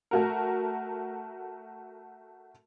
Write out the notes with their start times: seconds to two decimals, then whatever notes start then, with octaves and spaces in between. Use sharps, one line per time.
0.11 A3 F#4 A#4